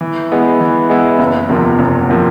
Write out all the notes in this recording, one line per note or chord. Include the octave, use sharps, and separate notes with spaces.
E3
G#3 B3 E4
E3
G#3 B3 E4
F#1
E2 C3 F3 A#3
F#1
C3 F3 A#3